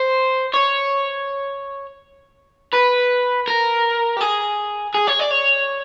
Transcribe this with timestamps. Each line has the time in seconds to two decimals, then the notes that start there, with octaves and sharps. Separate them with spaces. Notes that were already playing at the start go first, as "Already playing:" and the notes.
Already playing: C5
0.54 C#5
2.73 B4
3.48 A#4
4.17 G4
4.21 G#4
4.94 G#4
5.07 C#5
5.19 D5
5.30 C#5